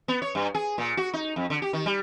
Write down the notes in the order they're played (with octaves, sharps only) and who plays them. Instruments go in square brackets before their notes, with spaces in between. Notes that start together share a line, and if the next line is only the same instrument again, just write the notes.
[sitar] B3
C#5
G2
G#4
A#2
F#4
D#4
F2
D3
G4
D#3
G3